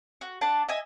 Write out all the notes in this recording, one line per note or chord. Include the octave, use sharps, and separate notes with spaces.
F#4
D4 F#5 A5
D#5 E5 G#5